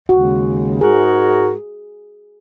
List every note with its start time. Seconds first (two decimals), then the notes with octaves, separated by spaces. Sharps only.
0.09 D#2 C#3 G#3 F#4
0.81 G#2 G#3 F#4 G#4 A#4